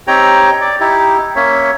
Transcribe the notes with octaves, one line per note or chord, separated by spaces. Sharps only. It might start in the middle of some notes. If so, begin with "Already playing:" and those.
C4 D#4 G4 C#5 G5 A#5
D5
D#4 E4 G4
A#3 C#4 C#5 E5